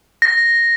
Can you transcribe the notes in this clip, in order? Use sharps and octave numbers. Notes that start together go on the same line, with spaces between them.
A#6